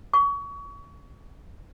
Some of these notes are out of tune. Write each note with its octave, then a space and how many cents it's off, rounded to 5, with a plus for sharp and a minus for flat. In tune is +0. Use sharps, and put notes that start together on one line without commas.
C#6 +30